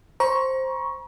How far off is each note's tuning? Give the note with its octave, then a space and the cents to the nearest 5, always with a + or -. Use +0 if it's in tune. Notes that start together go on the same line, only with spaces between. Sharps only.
C5 +5 A#5 +35 C#6 +0